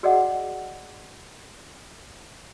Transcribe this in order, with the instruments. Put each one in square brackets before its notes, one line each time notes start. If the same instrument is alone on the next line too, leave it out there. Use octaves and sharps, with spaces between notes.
[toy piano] F#4 G#4 D5 D#5 F#5